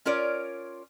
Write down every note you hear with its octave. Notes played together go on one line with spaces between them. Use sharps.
C#4 F4 A#4 C#5 D5